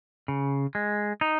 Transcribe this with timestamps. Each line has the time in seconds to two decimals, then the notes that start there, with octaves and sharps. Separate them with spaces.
0.28 C#3
0.75 G#3
1.21 D#4